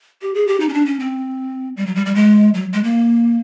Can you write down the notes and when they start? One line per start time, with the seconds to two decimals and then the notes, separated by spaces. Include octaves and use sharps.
0.22 G4
0.34 G#4
0.47 G4
0.60 D#4
0.69 C#4
0.74 D4
0.86 C#4
1.00 C4
1.77 G3
1.86 F#3
1.95 G3
2.06 G3
2.15 G#3
2.54 F#3
2.73 G#3
2.84 A#3